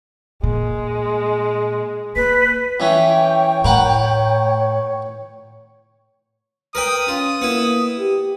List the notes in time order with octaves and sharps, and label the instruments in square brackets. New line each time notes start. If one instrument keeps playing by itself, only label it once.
[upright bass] A#2 [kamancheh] G#3
[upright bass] A#3 [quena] B4 [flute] B6
[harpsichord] E3 C#4 [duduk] C#5 [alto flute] G5
[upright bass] A2 [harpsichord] A#4 B4 F#5
[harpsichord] A#4 B4 G5 [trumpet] D#6
[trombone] C#4 [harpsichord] F4
[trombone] A#3 [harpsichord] B3 E4
[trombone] G4